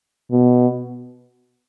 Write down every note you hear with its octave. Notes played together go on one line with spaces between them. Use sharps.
B2